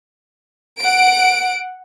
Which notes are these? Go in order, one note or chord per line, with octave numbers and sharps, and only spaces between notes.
F#5 D7